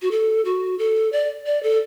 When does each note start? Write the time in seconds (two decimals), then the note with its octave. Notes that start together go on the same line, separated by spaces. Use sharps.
0.02 F#4
0.11 A4
0.45 F#4
0.79 A4
1.13 D5
1.46 D5
1.63 A4